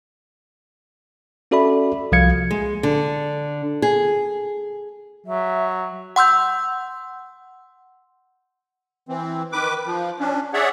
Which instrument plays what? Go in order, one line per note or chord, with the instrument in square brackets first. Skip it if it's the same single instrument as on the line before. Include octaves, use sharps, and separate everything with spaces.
[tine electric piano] C#4 F#4 A4 D5 E5 B5
C2 F3 F5 G#6 C#7
[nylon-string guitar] G#3
D3
G#4
[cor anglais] F#3 [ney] E5
[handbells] F#5 C6 E6 G6
[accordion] E3 C4
D#3 B4 D6
F3
C#4 D4
G#4 C#5 D5 E5 F#5